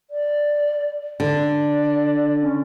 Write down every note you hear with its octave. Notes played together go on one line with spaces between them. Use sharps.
D5
D3 D5
C#4